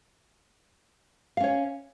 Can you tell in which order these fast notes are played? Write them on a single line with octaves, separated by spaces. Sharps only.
F5 C#4 C#5